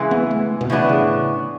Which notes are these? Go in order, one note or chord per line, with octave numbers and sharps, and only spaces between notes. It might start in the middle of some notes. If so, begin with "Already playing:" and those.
Already playing: C#3 E3 G#3
B3
A3
B2
A2 C#3 E3 B3 D4
C#3